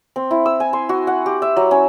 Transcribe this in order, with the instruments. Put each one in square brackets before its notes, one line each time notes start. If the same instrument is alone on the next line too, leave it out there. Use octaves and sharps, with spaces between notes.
[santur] C4
E4
E6
G#5
C6
F#4
F#5
G4
E5
F#3
C#4